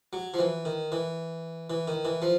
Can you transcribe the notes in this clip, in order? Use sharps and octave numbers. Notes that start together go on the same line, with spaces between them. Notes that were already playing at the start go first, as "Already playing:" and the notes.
F#3
F3
E3
D#3
E3
E3
D#3
E3
F3